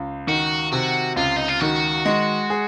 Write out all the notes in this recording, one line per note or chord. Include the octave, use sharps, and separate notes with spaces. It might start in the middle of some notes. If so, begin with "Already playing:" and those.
Already playing: C#2
D#3 F#4
C3 F#4
C#2 F4
D#4
F4
D#3 F#4
G#3
G#4